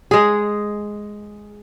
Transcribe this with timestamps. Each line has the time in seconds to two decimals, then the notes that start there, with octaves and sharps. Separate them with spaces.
0.11 G#3 G#4